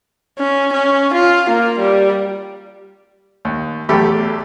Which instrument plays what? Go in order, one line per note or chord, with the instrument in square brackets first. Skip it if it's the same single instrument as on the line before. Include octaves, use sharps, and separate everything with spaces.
[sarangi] C#4
C#4
F4
A#3
G3
[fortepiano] D#2
B1 E2 A3 G4 B5